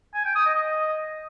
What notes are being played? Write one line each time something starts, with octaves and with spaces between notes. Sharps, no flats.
G#5
G5
D#6
D#5